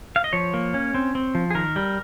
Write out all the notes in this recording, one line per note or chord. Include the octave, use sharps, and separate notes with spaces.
F5
D#5
F3 C#5
A#3
C#4
C4
C4
F3
G#4
D#3 A#4
G3